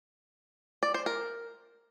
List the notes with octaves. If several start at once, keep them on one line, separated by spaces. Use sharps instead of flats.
D5
C5
A#4